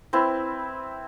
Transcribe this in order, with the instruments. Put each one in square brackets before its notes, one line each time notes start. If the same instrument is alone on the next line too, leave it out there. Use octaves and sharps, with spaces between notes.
[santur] C4 E4 B4